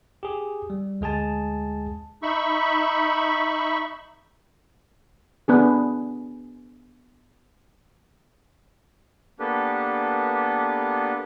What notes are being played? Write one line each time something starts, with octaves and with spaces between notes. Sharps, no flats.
G4 G#4
G3
D2 G#3 G#4 G#5 A5
D#4 E5 B5 C#6
B3 D4 G#4
A#3 B3 D4 G4 A4 B4